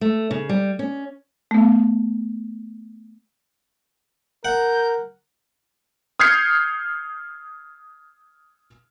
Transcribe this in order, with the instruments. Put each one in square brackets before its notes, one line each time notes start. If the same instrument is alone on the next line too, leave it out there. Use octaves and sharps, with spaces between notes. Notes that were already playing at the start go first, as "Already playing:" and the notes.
[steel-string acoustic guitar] A3
C#3
G3
C#4
[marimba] A3 B3
[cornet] A#4 [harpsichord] F#5 [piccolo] G6
[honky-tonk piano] D#6 F6 G6 G#6 C7 C#7